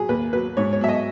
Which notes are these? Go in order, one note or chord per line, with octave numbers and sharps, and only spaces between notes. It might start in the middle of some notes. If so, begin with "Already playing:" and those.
Already playing: F#3 G#4
D#2 B4
F#3 B4
G#2 C#5
C#5
F#3 E5
D#5